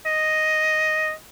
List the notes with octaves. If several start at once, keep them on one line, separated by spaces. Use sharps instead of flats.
D#5